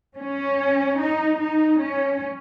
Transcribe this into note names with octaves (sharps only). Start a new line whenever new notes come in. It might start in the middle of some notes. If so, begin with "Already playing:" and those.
C#4
D#4
D#4
C#4